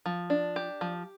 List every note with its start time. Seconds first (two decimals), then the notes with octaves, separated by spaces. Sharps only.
0.06 F3
0.30 D4
0.56 G4
0.81 F3